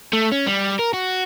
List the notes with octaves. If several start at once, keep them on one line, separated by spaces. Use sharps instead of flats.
A3
C#4
G3
A#4
F#4